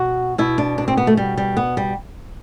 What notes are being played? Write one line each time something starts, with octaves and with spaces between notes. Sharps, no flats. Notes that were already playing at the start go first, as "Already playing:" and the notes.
Already playing: B2 F#4
B2 E4
D4
D4
C4
B3
A3
G3
G3
B3
G3